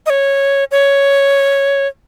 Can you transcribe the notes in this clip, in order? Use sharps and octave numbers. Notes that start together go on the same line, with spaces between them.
D#5
C#5
C#5